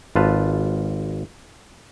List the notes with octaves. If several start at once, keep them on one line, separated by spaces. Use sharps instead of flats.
G#1 F4 B4 A5